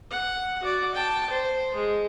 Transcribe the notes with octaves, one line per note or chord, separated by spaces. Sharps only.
F#5
F#4 D5
G5 A5
C5
G#3